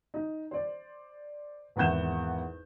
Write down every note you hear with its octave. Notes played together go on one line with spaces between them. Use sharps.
D#4
C5 D5
G#1 E2 E4 F#5 G6 E7